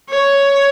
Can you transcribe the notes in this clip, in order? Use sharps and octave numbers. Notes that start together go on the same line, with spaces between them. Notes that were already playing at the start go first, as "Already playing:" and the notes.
C#5